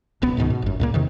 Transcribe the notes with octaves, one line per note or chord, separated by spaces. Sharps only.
D1 B1 B3
C#2 G#2 B2 D#3
B2
G1 F#2
C#2 A#2 A#3
E2 C3 D#3